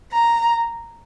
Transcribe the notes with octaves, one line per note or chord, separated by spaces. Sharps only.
A#5